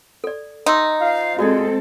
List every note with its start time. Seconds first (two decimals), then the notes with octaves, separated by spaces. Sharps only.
0.24 A4 D5
0.66 D#4 E5 C6 E6
1.01 F4 C5 F5
1.39 G#3 C4 F4 F#4 G#4 A4 D5 D#5